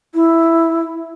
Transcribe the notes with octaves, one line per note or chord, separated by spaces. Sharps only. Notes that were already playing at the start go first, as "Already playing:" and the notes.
E4